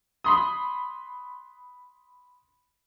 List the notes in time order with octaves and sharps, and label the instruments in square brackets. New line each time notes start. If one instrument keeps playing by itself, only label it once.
[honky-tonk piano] B5 C6 D#6